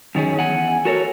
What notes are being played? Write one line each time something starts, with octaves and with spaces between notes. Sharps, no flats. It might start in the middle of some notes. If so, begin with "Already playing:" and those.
F#2 D#3 C#4 G#4
E2 F#5 G#5
F#4 A4 A#4 C5 C#5